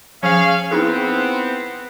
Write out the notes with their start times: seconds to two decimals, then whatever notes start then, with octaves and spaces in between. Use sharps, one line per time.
0.23 F3 C#4 G#4 F5
0.71 B3 C4 D#4 E4 G#4